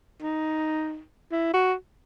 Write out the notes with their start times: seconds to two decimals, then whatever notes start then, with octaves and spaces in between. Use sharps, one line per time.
0.22 D#4
1.32 E4
1.54 F#4